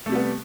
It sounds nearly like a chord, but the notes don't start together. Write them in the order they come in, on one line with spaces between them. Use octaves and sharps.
A3 C3 G3 B3